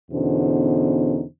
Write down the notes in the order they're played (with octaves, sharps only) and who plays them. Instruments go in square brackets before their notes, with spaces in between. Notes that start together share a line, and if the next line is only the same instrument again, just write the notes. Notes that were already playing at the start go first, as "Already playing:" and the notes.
[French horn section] E2 B2 D3 C#4 D#4 C5